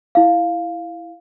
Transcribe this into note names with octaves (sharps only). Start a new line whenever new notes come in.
E4 F5